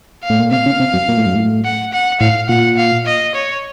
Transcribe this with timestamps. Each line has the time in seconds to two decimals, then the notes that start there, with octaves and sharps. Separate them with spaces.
0.23 F5
0.30 A2
0.40 A#2
0.51 C3 F5
0.66 C#3
0.80 C3
0.93 F#2
1.08 A#2
1.17 A2
1.26 F#2
1.35 A2
1.65 F#5
1.93 F#5
2.20 A2 F5
2.49 A#2 F#5
2.77 F5
3.07 D#5
3.35 C#5